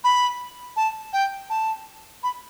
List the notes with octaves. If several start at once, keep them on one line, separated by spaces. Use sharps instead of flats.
B5
A5
G5
A5
B5